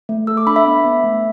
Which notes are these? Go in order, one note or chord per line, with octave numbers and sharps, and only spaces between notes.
A3
A4 E6
D6
D4 B5
E5
B3
B3
A3